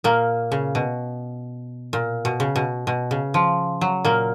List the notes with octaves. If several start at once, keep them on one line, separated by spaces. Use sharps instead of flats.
A#2 A#3
C#3
B2
A#2
B2
C#3
B2
B2
C#3
F3
F#3
A#2 A#3